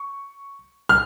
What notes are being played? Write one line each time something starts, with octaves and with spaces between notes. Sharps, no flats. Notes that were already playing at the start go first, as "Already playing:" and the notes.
Already playing: C#6
F6